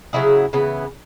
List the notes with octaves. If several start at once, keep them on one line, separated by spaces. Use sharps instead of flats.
C#3 F#3 E4 G#4
C#3 E3 B3